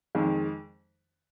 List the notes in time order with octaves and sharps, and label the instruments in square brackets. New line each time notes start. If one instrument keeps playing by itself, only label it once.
[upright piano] F2 D#3 G#3